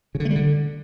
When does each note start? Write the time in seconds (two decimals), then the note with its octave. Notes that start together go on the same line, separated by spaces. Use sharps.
0.15 C#3
0.20 D3
0.25 A3
0.30 G3
0.36 D3